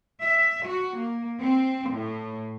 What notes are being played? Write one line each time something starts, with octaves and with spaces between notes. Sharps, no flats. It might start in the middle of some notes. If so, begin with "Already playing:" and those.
E5
F#4
A#3
C4
A2